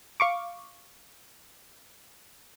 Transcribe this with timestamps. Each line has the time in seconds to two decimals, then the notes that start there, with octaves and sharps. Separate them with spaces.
0.20 F5 C#6 D6